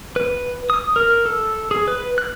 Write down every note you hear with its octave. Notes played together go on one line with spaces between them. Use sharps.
B4
D#6
A#4
A4
G#4
B4
F#6